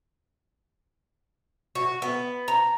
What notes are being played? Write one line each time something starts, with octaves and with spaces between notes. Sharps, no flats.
F#4
B3
A#5